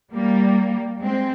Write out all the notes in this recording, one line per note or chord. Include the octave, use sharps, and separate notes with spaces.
G3 A#3
G#3 C4